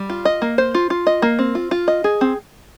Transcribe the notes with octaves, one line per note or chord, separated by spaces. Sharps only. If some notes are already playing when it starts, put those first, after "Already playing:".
Already playing: G3
F4
D#5
A#3
C5
F4
F4
D#5
A#3
C4
F4
F4
D#5
G#4
C4